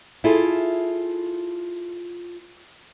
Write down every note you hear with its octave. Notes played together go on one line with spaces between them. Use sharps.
E4 F4 G#4 A4